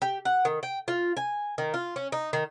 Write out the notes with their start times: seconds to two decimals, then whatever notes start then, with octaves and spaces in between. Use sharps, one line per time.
0.02 G4
0.25 F#5
0.45 D#3
0.63 G5
0.88 F4
1.17 G#5
1.58 D#3
1.74 F4
1.96 C#4
2.12 D#4
2.33 D#3